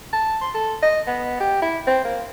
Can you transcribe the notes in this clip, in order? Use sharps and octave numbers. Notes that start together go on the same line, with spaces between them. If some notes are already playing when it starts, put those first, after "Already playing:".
A5
C6
A4
D#5
B3
G4
E4
C4
A#3